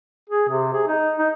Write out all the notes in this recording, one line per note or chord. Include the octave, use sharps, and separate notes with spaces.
G#4
C3
G#4
D#4
D#4